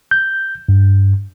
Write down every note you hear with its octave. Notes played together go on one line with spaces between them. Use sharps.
G6
G2